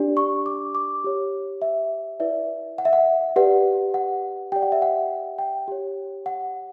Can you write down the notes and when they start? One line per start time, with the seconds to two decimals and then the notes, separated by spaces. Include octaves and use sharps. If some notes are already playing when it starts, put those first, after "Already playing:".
Already playing: D4 G4 D5
0.17 C#6
0.46 D6
0.75 D6
1.04 G4 C#5
1.62 E5
2.20 E4 B4 D5 E5
2.78 F#5
2.85 E5
2.93 F#5
3.36 G4 B4 D5 F#5
3.94 F#5
4.52 G4 D5 G5
4.62 F#5
4.72 E5
4.82 F#5
5.38 G5
5.68 G4 C#5
6.26 F#5